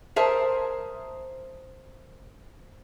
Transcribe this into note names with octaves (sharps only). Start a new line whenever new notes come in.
G#4 A#4 C5 E5 A5